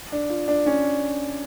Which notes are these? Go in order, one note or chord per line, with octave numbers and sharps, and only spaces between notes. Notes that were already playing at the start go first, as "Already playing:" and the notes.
D4
F4
D4
C#4